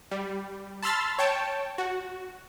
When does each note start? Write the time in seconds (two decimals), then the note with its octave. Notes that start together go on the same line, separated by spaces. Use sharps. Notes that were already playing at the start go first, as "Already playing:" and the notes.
0.11 G3
0.83 A5 B5 C6 E6 F6 A6
1.19 C#5 G5 A5
1.78 F#4